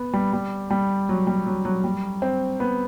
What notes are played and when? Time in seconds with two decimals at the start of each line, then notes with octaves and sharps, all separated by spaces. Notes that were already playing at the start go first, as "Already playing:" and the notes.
Already playing: B3
0.13 G3
0.33 G3
0.70 G3
1.09 F#3
1.27 G3
1.46 F#3
1.65 F#3
1.84 G3
2.22 C4
2.60 B3